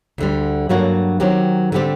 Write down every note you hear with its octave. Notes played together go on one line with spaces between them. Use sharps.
D2 D3 G3
G2 F#3 A#3 D4 F#4
D#3 F#3 C4 G4
D3 G3 C4 G4